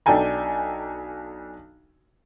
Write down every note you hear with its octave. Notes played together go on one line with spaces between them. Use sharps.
B1 D4 A4 G5 G#5 A#5